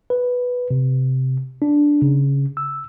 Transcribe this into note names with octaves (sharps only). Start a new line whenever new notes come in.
B4
C3
D4
C#3
E6